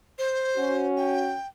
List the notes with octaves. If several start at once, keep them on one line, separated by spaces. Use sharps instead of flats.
C5
C#4 F#4
G5